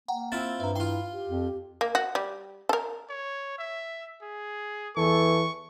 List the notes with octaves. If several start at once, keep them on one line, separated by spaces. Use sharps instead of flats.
A#3 F#5 G5 A#5
C4 E4 F4 A6
G2 B4 E5 A#5
E4 F4 G5 C6
G4
F2
A#3
F#4
G3
A4 A#4
C#5
E5
G#4
E2 E3 A4 C#6